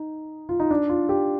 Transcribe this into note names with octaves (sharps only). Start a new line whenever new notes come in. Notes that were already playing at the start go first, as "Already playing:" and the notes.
Already playing: D#4
F4
D#4
D4
F4
G4